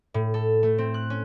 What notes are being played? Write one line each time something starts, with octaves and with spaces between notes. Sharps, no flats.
A2
A4
A3
C4
F#6
C#4